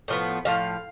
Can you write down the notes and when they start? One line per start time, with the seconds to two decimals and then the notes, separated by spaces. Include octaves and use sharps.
0.08 A2 F3 B3
0.45 A2 F3 F5